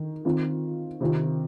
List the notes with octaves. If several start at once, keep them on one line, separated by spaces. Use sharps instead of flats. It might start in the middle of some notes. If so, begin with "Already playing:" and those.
Already playing: D#3
D#3 C4 F4
C3 D#3 C4 F4